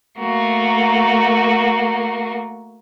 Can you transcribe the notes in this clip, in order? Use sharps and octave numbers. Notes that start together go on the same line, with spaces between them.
A3 A#3 F#4